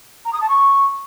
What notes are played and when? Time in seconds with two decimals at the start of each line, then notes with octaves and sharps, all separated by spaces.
0.25 A#5
0.32 D#6
0.40 A5
0.48 C#6